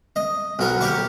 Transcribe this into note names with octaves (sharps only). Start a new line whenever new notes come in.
D#5
B1 F#4 A#4
G4 A#4 D5 C#6